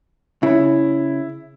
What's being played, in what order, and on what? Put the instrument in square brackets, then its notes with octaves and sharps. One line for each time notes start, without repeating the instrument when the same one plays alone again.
[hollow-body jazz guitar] C#3 [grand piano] E4